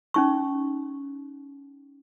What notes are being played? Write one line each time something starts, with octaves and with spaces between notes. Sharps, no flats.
C#4 D#4 C#6